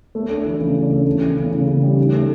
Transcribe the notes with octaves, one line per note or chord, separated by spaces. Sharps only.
A3
D4
E3
C#3
D4
A3
C#3
E3
C#3
C#3
C#3
G3
D#4
A3